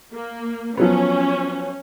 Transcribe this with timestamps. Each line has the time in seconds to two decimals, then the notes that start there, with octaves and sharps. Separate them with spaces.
0.13 A#3
0.77 F3 F#3 B3 C#4